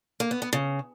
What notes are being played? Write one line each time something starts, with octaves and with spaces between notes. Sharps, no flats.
A#3
B3
B3
C#3